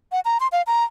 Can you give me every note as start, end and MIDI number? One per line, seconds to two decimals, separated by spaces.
0.12 0.20 78
0.25 0.38 82
0.40 0.48 84
0.52 0.62 77
0.67 0.84 82